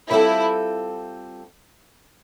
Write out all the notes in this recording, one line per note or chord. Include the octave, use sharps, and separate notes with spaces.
G3 C4 E4 F4 A4